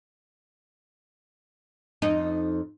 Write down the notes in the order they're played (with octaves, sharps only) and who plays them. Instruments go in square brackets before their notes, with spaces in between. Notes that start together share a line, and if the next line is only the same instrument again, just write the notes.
[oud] F2 D#4